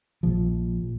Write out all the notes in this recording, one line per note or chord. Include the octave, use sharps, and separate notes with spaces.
A#1 A#2 F3